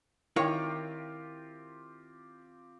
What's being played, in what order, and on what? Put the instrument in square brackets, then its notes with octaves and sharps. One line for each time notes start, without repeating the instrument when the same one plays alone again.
[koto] D#3 C#5 [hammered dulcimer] C4 F4 G4 [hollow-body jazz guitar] E4 A#4 F5